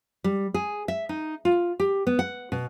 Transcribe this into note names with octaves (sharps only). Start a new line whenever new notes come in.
G3
G#4
E5
D#4
F4
G4
B3
F#5
B2